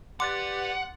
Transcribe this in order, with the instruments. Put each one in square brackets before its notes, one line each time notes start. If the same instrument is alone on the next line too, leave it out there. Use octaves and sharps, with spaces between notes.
[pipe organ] G4 B4 D5 [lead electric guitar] F#5 [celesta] C6 F#6 A6 [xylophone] D6